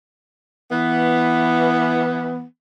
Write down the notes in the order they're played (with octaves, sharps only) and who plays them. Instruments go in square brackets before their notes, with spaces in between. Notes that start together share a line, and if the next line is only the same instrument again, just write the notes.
[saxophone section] E3 B3